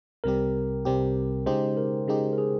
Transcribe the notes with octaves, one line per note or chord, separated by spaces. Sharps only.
C2 C3 G3 C4 G4 A#4
C2 C3 G3 C4 G4
C#3 G#3 D#4 G4 C5
A#4
C#3 G#3 D#4 G4 G#4
A#4
G#4